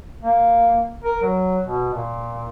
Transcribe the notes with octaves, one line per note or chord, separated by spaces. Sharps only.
A#3
A#4
F#3
B2
A#2